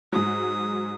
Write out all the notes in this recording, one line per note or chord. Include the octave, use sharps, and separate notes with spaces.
G#2 F#3 D#6